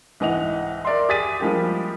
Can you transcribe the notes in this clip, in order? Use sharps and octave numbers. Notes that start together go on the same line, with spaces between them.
C2 G#2 E3 D#5 F#5 F7
A#4 D5 E5 C6
G4 G#4 A6 B6 D#7
F3 G3 G#3 A#3 G4